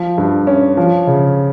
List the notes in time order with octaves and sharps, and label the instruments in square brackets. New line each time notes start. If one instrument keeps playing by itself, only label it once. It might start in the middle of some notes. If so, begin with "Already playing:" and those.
Already playing: [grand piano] F3
G2
C#4
F3
C#3